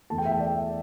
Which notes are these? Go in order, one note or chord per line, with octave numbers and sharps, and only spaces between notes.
E2 E3 A3 A5
G5
E5
G5
D5